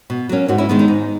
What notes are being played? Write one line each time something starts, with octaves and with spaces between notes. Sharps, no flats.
B2
F#3 A#3 C#4
G#2 D#4 F#4
C#4 E4
D#3 G#3 B3 D#4
D#4
G#2